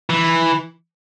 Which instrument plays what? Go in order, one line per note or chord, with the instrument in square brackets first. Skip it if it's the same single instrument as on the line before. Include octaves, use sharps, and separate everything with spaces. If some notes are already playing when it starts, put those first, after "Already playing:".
[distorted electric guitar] E3